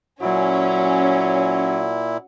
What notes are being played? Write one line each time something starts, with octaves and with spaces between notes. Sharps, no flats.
A#2 F#3 C#4 E4